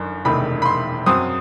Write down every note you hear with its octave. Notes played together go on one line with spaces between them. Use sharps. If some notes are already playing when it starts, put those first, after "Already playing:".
Already playing: G1 F#2 D#3
E1 E2 C3 D#3 A3 B5
B5
C6
F#2 F#3 C4 D#6